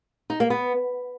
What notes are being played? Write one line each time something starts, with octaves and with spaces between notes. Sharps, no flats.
D#4
A#3
B3